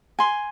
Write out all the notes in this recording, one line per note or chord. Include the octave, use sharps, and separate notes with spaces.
G#5 C6